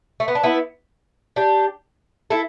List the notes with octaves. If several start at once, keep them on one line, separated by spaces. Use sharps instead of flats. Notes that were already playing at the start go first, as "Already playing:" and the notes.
A3
B3
D4
B3 E4
D4 G4
E4 A4